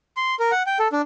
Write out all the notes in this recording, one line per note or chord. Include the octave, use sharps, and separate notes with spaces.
C6
A#4
F#5
G5
A4
D4